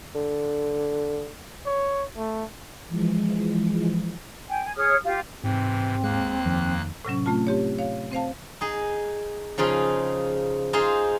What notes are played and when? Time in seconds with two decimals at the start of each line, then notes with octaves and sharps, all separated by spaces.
0.15 D3
1.66 C#5
2.17 A3
2.88 E3 F3 G#3
4.49 G5 G#5
4.63 G#5
4.76 G#4 C#5 D#6 F6
5.04 F4 G4
5.44 G#2 C3 E3 C4
6.03 D#2 G#3 A#3 F#6
6.45 F2 D#3 F3
7.05 A2 C3 F#3 C#4
7.26 A3 C4 F4 A5
7.47 C4 G4 C#5
7.79 C#5 F5
8.12 C4 C5 F5 A5
8.61 D#4 G#4
9.58 C#3 F3 D#4 F4 G#4
10.73 D#4 F4 G#4 C5